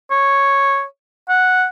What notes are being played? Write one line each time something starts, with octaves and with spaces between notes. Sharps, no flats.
C#5
F#5